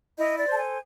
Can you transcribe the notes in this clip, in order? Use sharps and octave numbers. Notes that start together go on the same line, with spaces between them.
E4 D#5
D5
A4 C5 A5
G#5